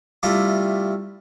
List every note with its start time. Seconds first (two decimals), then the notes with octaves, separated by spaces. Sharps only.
0.23 C3 G3 A3 E4 F4